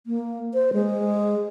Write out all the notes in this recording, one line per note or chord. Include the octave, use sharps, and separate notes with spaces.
A#3
C5
G#3